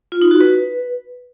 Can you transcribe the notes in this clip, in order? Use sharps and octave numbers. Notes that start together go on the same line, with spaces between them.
F4
D#4
F#4
B4